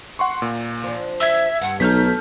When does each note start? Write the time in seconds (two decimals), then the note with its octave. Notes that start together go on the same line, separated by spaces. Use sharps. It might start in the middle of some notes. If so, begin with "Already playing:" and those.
0.19 F#5 C6 C#6
0.42 A#2
0.84 F3 D4
1.20 E5 E6 G#6
1.61 G2 F#5
1.80 B1 A3 D#4 F6 G6 B6